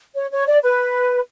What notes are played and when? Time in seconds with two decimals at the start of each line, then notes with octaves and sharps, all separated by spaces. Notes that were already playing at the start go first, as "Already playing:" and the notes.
0.15 C#5
0.32 C#5
0.47 D5
0.63 B4